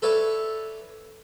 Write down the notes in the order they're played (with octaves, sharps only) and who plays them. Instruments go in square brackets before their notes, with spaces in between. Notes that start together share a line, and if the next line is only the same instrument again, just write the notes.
[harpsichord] A4 B4 C#5 D5 E5